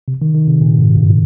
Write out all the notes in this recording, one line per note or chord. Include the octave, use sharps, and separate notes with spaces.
C3
D#3
D#3
C3
A#2
G#2
G2